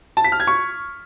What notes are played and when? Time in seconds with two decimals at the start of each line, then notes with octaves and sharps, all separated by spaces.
0.17 A5
0.24 B6
0.32 F6
0.40 G#6
0.47 C#6